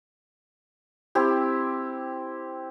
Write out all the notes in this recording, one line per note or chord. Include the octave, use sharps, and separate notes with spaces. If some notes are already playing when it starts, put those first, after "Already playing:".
C4 E4 G4